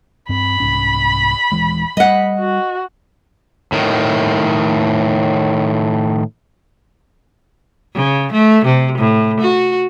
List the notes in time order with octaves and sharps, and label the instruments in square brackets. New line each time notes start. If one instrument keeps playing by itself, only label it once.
[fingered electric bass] G2 C4 [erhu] B5
[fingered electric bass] C2 G#2 C#4
D#1 E3 G#3
[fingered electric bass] G3 [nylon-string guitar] D#5 F#5
[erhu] F#4
[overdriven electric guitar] A2 D#3
[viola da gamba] C#3
A3
C3
A2
F#4